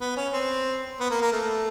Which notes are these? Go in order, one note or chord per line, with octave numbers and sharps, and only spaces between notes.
B3
C#4
C4
B3
A#3
A#3
A3